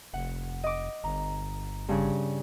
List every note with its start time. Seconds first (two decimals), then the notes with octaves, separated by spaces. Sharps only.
0.14 F1 F#5
0.64 D#5 D6
1.04 G1 A#5
1.89 G2 C#3